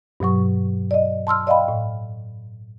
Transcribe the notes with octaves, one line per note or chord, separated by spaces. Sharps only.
G2 B2 F#3 C#6
D5 D#5
A5 C6 E6 F6
D5 D#5 F5 G5 B5
A2